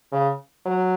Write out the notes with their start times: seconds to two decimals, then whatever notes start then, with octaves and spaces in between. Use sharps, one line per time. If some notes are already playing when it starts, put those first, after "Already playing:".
0.12 C#3
0.65 F#3